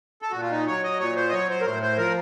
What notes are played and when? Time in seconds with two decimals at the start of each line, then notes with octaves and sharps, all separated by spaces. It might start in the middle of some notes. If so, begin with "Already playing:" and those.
0.22 A4
0.31 A#2 F#4
0.42 F4
0.51 D#4
0.67 F#3 C#5
0.84 D#5
0.99 A#2 C#5
1.16 C5
1.29 D#5
1.32 F#3 C#5
1.49 C5
1.61 A#4
1.65 A2 C5
1.82 C5
1.98 F3 A#4